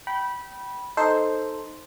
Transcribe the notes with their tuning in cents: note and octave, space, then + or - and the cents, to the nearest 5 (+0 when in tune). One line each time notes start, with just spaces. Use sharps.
G5 -25 B5 -15
D#4 +0 A4 +0 C5 +0